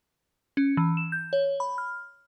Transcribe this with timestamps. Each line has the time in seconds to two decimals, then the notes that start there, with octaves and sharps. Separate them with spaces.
0.57 C#4
0.77 E3
0.97 E7
1.12 G6
1.33 C#5
1.60 B5
1.78 F6